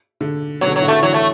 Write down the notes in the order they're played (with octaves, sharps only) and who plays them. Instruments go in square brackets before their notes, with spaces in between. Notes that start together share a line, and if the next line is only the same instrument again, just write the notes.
[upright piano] D3
[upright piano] B2 [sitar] F#3
[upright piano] D3
B2
[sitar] F#3
[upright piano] A2
[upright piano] D3 [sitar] A3
[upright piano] E3 [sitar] F#3
[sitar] A3